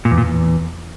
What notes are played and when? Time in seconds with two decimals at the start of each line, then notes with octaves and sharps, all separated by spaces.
0.05 A#2
0.11 E2
0.18 A#2
0.24 E2